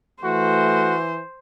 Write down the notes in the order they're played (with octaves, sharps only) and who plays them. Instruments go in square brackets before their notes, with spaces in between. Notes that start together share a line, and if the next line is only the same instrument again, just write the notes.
[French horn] E3 [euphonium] A3 [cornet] F#4 [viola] C5